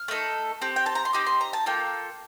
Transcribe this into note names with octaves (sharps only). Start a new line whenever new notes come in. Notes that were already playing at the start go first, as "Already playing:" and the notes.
Already playing: F6
A3 D#4 A4
C4 G4
G5
A5
A#5
C6
C4 D#4 G4 D6
C6
A#5
A5
A#3 F4 A4 G5